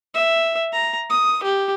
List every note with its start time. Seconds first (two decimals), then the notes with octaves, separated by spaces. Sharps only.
0.15 E5
0.73 A#5
1.10 D#6
1.44 G4